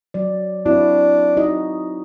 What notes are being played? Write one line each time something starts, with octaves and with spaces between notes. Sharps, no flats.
F#3 D5
C4 D4 E4 F#4
D#4 F#4 D#5